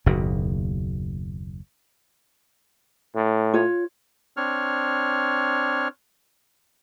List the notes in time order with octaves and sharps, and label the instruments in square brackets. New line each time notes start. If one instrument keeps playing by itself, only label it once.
[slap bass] F#1 D#2 B2
[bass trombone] A2
[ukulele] F4 C#5
[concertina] C4 D4 C#5 F6